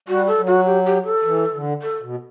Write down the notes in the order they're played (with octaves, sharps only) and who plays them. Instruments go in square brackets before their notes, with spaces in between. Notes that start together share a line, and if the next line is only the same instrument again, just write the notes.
[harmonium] G3 [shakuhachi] F#4
[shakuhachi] A4
[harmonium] F#3
[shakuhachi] F#4
G4
G4
A4
[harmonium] E3
D3
[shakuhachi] A4
[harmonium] B2